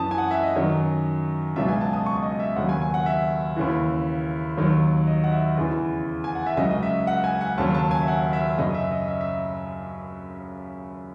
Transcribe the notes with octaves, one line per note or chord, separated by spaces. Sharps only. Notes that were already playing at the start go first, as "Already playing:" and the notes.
Already playing: F#2 E3 A5 D#6
G#5
F#5
E5
D#5
F#2 D#3 F#3
C#2 B2 F#3 E5
G#5
A5
D#6
C#6
D#5
E5
D#2 C#3 F#3 F#5
G#5
G#5
F#5
E5
D#2 C#3 E3
D#2 D#3 F#3
D#5
F#5
E5
E2 C#3 E3
G#5
F#5
E5
C#2 C#3 F#3 D#5
D#5
E5
F#5
G#5
F#5
D#2 C#3 F#3 A5
A5
G#5
E5
F#5
E5
F#2 C#3 F#3 D#5
E5
D#5
E5
E5